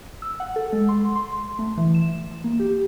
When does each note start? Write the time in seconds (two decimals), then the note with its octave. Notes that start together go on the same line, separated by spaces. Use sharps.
0.22 E6
0.40 F#5
0.56 A4
0.73 G#3
0.89 C6
1.16 C6
1.59 A3
1.78 E3
1.94 E7
2.44 A#3
2.60 G4